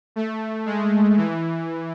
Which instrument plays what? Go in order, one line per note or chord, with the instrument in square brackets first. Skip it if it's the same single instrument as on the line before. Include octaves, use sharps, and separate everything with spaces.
[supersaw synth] A3
G#3
E3